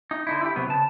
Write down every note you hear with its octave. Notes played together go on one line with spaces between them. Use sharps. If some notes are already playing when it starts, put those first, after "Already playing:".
D#4
D3 D#4 E4
E4 G4
C3 F#3 B3
C#3 A5